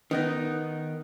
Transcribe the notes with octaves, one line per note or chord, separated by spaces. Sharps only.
D#3 B3 D#4